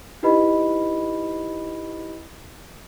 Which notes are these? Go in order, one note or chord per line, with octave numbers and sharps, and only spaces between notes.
D#4 E4 G4 B4 D#5 B5